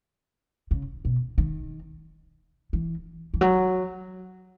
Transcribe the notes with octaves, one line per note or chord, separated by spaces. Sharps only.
C#3
B2
D#3
E3
E3
F#3